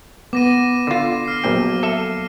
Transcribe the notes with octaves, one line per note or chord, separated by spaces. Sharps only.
B3 D6 A#6 D#7
D3 F4
F6 C7
A#1 F#3 A#3 B3 G5
A4 E5